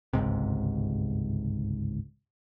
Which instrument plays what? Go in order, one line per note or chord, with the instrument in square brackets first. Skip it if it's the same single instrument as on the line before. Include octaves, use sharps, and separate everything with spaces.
[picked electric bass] G1 C#2 G#2 C3